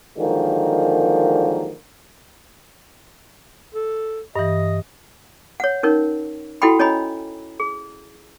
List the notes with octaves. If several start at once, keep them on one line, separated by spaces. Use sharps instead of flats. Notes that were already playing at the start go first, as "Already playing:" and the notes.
D3 D#3 F3 F#3 G#3 A#3
A4
G2 E3 D#5
C#5 F#5
C#4 D#4 A#4 C#5
E4 F#4 A4 F#5 G5 B5
C#4 C#5 D#5 G#5 A#5 B5
G#4